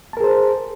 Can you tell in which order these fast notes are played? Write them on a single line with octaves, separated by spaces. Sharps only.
A5 A#4 G#4 C5